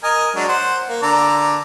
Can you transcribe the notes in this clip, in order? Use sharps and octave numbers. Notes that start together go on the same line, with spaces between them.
A#4 D#5 G#5
F#3 G#3 D4
C5 F#5
A#3
D3 D5 A#5